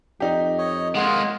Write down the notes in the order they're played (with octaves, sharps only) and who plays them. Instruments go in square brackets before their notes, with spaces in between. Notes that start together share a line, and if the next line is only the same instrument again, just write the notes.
[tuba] F2 [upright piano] D#4 G4
[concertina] C#5 D#5
[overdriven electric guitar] G#3 A#3 [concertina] F4 F#5